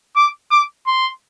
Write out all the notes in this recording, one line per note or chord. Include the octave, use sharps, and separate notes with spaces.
D6
D6
C6